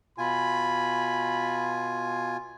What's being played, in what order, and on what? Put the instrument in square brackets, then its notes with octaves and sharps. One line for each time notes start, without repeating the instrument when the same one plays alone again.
[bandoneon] B2 F4 G#5 [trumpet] B5